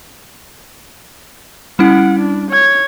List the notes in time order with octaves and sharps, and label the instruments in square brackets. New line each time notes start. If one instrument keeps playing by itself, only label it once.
[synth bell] G3 C#4 E4 [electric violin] F#5
[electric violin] D4
C#5 G#6